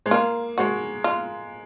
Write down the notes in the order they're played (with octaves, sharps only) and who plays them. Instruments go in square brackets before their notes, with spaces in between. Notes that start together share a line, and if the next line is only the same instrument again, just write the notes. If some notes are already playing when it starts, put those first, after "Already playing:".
[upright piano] G#3
[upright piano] A#3 [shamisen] F4
[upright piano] G#3 [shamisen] F#4
[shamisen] F4